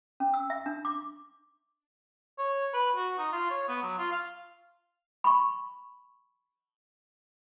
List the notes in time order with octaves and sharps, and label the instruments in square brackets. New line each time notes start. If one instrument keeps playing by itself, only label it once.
[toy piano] C#4
E6
E5
D4
D6
[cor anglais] C#5
B4
F#4
D#4
F4
C#5
B3
F#3
F4
F5
[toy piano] B5 C#6